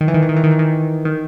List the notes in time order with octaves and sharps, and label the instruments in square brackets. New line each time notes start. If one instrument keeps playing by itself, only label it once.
[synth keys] D#3
E3
D#3
E3
D#3
E3
D#3
E3
D#3
D#3